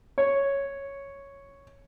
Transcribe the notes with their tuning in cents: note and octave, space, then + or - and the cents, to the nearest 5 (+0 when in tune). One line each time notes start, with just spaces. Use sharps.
C#5 +0